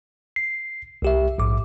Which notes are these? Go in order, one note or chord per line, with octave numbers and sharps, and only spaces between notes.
C7
C2 G4 E5
A#1 G#2 D6